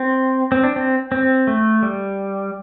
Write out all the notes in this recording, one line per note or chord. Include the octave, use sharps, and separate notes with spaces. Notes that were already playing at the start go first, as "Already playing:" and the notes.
Already playing: C4
C4
D4
C4
C4
A3
G3